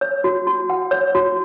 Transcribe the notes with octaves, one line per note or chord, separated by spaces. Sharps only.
C#5
F#4
F#4
F#5
C#5
F#4